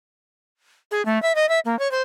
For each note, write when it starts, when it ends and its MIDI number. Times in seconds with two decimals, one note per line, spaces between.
0.91 1.04 68
1.05 1.21 57
1.22 1.35 76
1.35 1.49 75
1.49 1.59 76
1.65 1.78 58
1.79 1.90 73
1.91 2.02 72